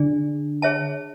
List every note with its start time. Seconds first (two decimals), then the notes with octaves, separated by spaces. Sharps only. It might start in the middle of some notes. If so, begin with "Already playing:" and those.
Already playing: D3 D4 G#4 D5
0.62 G#4 C#5 E5 A5